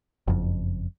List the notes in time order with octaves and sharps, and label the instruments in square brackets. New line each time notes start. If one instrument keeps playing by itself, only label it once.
[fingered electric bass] F#1 F2